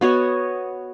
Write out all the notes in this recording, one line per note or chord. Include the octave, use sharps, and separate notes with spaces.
B3 F#4 C#5 D#5